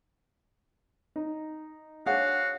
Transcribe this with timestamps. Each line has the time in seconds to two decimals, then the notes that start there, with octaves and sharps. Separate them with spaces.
1.16 D#4
2.06 D4 F#4 G#4 C5 C#5 F5 F#5